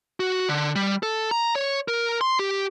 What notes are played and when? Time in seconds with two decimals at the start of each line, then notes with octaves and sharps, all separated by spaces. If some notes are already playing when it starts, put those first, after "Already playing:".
0.20 F#4
0.49 D3
0.76 G3
1.03 A4
1.31 A#5
1.55 C#5
1.88 A#4
2.21 C6
2.39 G4